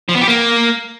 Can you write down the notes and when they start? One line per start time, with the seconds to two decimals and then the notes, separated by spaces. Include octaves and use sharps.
0.09 F3
0.15 B3
0.21 G4
0.28 A#3